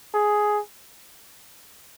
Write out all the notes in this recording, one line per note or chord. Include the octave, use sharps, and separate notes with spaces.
G#4